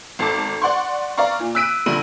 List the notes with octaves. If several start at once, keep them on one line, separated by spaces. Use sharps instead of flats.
G#1 A4 A5 D6
D5 F#5 C6 C#6
D5 F5 A#5 C#6
A#2
E6 F#6 B6 D7 D#7
A#1 D3 G3 D#7 F#7